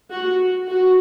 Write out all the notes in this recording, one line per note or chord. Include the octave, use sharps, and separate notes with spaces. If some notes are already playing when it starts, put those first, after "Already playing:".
F#4
F#4